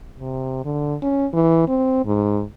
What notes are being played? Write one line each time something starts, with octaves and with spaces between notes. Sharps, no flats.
C3
D3
C#4
E3
C4
G#2